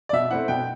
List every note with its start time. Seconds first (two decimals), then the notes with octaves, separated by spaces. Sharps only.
0.09 D5
0.13 B2 E5
0.31 A3 C4 E4 F#5
0.48 B2 G5